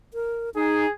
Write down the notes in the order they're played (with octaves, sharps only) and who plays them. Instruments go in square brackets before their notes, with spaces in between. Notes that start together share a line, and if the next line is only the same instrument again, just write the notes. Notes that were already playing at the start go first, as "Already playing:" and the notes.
[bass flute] A#4
[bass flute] D#4 [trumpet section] G#4